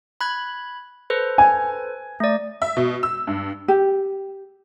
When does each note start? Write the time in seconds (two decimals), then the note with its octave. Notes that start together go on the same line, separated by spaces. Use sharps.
0.21 B5 F#6 G#6
1.10 A4 B4 C5
1.38 G#5
2.20 A3 D5
2.62 E5
2.77 B2
3.03 E6
3.27 G2
3.68 G4